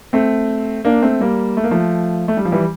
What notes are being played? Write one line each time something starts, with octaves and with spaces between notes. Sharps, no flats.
A3 C4
A#3 D4
A3 C4
G3 A#3
A3
A#3
F3 A3
A3
G3
F3
E3 G3